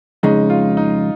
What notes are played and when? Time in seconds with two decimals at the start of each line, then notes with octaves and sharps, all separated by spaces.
0.23 F2 C#3 G#3 D#4
0.50 F4
0.77 D#4